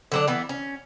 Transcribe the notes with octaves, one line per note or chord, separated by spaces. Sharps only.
D3 F#3 D4
E3 B3
C#4